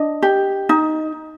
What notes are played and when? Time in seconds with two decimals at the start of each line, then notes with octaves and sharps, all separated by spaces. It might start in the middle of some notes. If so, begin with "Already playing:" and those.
Already playing: D4 D#5
0.22 G4
0.69 D#4